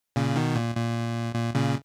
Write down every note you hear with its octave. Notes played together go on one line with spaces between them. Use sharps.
A#2 C#3
B2 D#3
A#2
A#2
A#2
A#2 C#3